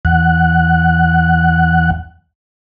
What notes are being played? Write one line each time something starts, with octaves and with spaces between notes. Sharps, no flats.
E2 F#5